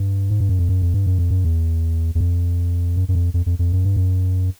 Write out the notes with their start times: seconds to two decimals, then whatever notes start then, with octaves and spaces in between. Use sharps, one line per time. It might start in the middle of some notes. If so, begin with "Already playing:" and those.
Already playing: G2
0.30 G#2
0.40 G2
0.49 F#2
0.59 F2
0.69 F#2
0.82 F2
0.94 G2
1.06 F#2
1.18 F2
1.30 F#2
1.45 E2
2.15 E2
2.21 F2
2.96 F#2
3.08 F#2
3.15 F2
3.34 F2
3.46 F2
3.59 F2
3.73 F#2
3.85 G2
3.96 F#2